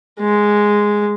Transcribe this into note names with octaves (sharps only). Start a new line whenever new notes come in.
G#3